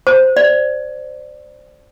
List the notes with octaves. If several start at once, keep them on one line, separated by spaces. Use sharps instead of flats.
C5
D5